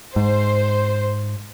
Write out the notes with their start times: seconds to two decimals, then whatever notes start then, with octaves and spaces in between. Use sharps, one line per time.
0.16 G#2 C5